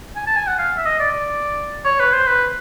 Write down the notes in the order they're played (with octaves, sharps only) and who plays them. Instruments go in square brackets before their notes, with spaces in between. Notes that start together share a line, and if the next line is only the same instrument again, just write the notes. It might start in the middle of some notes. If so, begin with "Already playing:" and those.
[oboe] G#5
A5
G#5
F#5
F5
E5
D#5
D5
C#5
B4
C5
B4